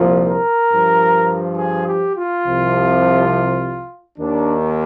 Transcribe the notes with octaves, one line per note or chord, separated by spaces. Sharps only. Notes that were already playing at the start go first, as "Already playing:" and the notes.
Already playing: C2 A#2 F3
A#4
G2 F3
G#4
G4
F4
C2 C3 F3
D#2 D#3 D4